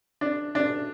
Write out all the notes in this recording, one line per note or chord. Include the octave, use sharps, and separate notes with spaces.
D4
D4